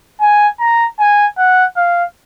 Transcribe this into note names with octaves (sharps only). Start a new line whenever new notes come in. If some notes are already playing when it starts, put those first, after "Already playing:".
G#5
A#5
G#5
F#5
F5